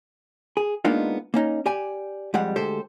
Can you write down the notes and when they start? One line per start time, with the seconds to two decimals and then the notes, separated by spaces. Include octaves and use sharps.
0.57 G#4
0.85 G#3 A#3 B3 D4 D#4 F4
1.34 A#3 C#4 D#4
1.66 G4 D5 G#5
2.34 F2 G3 G#3 F#5
2.56 D2 G#3 G4 A4 C5